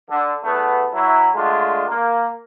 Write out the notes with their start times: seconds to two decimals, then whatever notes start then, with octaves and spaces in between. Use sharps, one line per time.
0.10 D3
0.44 E2 A3 B3
0.93 F#3 E4
1.35 D3 G#3 A3 D4 F4
1.88 A#3